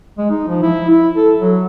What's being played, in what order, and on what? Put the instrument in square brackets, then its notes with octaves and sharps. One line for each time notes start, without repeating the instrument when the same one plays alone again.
[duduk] G#3
D#4
F3
E4
E4
A4
F#3